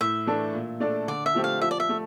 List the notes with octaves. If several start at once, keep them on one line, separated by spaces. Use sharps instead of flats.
A2 E5
E3 A3 D4 A4
A#2
A3 D4 A4 D5
D3 D5
E5
F3 A3 C4 G4
F5
F3 E5
D5
E5
A3